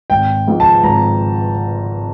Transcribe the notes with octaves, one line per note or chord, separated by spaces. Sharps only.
G#1 G5
G#2 F3 G#3
A5
G#1 A#5